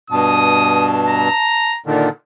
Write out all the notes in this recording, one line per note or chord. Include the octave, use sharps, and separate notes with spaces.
G2 B2 A5 D#6
A#5
A#2 D3 D#3